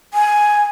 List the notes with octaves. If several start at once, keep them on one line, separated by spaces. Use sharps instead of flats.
G#5